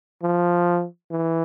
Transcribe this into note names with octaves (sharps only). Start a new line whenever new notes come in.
F3
E3